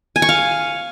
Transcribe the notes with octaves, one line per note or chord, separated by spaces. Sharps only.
G#5
C#6
F5